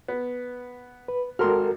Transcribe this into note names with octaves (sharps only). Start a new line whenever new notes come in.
B3
B4
G#1 F#4 A4 A#4 C6 F6